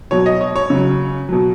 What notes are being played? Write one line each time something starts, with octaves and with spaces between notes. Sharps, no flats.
B2 F#3 C#5
D#5
C#5
C#5
C#3 F#3
B2 F#3